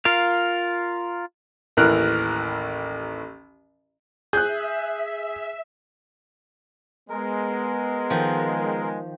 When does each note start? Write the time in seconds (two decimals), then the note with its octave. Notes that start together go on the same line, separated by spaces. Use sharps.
0.05 F4 A#4 F5
1.77 A1 D#2 E3 A#4 F#6
4.33 G#4 E5 F#6 G6
7.09 G#3 B3 A#4
8.10 D#3 F3